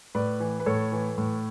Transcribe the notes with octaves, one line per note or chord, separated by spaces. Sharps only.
A2 B4 D5
E3
B4
A2 A4 C#5
E3
A2